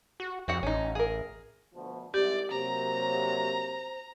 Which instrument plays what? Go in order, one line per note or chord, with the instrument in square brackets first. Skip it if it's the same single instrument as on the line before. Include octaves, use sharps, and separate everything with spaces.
[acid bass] F#4
[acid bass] F2 [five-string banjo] C4 F#4 F#5
[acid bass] A1 [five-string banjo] C#4 D#4
[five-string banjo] G#4 A#4
[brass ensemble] D2 B2 F3
[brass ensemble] C2 G#2 C3 [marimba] G4 [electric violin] D5
[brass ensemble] C3 F#3 A#3 [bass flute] C5 [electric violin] A#5